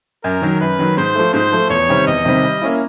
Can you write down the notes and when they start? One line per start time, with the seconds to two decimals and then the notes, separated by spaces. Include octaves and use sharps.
0.24 F#2 A#4
0.42 D#3 F#3
0.61 F#2 B4
0.79 D#3 F#3
0.97 G#2 C5
1.15 F3 A3
1.33 G#2 C5
1.52 F3 A3
1.70 E2 C#5
1.89 C3 D#3 G3 C4
2.07 E2 D#5
2.25 C3 D#3 G3 C4
2.44 G3
2.62 A#3 C#4 E4